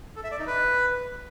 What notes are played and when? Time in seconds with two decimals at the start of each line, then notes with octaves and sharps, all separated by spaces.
0.16 A4
0.24 E5
0.31 D5
0.39 D#4
0.47 B4